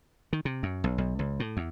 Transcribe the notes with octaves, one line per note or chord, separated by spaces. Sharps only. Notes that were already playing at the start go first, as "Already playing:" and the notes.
D#3
C3
F#2
B1
B1
C#2
A2
E2